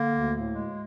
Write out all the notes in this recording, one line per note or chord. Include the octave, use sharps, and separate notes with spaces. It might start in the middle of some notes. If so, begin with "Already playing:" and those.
Already playing: D3 A#3
D2
A2
G#3